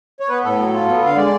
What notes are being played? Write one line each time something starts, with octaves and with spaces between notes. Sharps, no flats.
C#5
B3 B4
A2 A4
F#3
F4
B3
D3 F5
G#3 D5